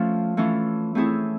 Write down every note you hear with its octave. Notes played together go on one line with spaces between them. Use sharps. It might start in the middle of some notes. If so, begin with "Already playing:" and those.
Already playing: F3 A3 C#4 F4
E3 A3 C#4 F4
A3 C4 E4 G#4 C#5